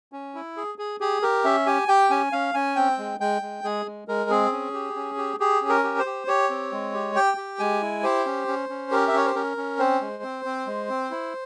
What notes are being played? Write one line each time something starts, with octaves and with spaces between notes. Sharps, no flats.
C#4
E4
G#4
G#4
G4 G#4
G4 A#4
C#4 E5
G4 G#5
G4 G5
C#4 G#5
C#4 F5
C#4 G#5
C4 G5
G#3
G#3 G5
G#3
G#3 G#4
G#3
G#3 A#4
C4 G#4
C#4
G4
C#4
G4
G4 G#4
C#4
A#4
G4
C5
G4
G4 C#5
C4
G#3
G4
G4 G5
G4
G#3 G#5
E4
G4 C5
C#4
C#4
C#4
G4 A#4
E5
C#4 C#5
C5
C#4 A#4
C#4
C4 C5
G#3
C4
C4
G#3
C4
E4